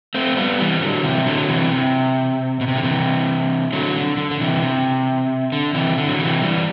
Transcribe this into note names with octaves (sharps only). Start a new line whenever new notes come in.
A3 C4
G3 B3
E3 G3
D3 F#3
C3 E3
D3 F#3
C3 E3
C3
B2
C3
D3
C3 E3
D3 F#3
D3
D3
D3
C3 E3
C3
D3
C3 E3
D3
F#3
C3 E3
E3 G3